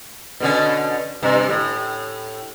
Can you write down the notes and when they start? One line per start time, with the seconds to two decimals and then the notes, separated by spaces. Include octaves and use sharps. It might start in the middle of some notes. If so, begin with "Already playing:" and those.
0.40 B2 D3 C#4
1.23 G2 C3
1.49 A2